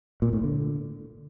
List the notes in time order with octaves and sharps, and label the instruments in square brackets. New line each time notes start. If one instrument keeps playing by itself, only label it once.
[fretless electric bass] A#2
A2
D3